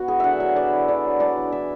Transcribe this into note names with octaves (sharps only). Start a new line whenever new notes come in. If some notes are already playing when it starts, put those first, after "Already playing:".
Already playing: B3 F#4
E4 G#4
D3 E5 F#5
F#3 E5
B3 D5
E4
D3 D5
F#3
D4 D5
E3
E3 E5